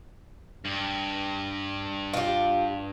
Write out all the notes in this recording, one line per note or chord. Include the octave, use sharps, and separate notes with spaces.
G2
F4 G4